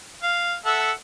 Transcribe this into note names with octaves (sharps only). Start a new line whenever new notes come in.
F5
A4 E5 F#5